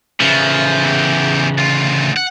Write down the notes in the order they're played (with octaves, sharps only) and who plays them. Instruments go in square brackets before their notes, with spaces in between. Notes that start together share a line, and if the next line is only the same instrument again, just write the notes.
[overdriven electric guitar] C#3 E3 [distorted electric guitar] F3
[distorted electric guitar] E2 G4
D2 F4
F#5